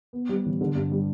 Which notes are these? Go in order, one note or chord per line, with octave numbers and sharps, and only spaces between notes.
B3
G3
A1
D3
G2
G3